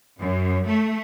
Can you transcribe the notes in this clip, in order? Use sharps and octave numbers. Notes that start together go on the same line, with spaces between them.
F#2
A3